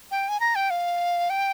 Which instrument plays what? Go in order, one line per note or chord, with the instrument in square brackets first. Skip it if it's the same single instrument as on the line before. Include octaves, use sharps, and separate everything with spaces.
[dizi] G5
G#5
A#5
G5
F5
G5